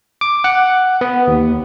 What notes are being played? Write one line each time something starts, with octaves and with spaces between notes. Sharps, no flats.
D6
F#5
B3
D#2